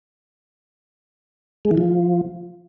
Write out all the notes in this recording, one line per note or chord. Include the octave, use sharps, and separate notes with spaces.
G#3
E3
F3